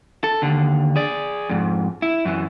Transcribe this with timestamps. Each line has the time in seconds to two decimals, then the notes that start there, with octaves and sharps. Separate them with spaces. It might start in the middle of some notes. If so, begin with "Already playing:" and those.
0.24 A4
0.42 D#2 D3
0.96 G#4 D5
1.49 F2 G#2
2.02 E4
2.25 F#2 E3